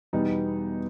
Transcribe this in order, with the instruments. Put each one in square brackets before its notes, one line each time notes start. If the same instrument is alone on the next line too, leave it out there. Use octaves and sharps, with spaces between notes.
[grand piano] E2 B2 G3 B3 D#4